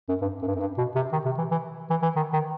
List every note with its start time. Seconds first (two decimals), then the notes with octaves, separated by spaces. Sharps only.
0.09 F#2
0.22 G2
0.43 F#2
0.47 G2
0.56 F#2
0.60 G2
0.78 B2
0.95 C3
1.12 D#3
1.25 C3
1.38 E3
1.52 E3
1.90 E3
2.03 E3
2.16 D#3
2.33 D#3